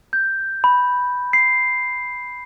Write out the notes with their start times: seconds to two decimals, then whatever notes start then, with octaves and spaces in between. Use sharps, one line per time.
0.13 G6
0.64 B5
1.33 C7